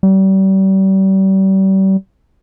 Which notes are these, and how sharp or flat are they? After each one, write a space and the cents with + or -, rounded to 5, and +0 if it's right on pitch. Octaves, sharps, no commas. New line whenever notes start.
G3 -35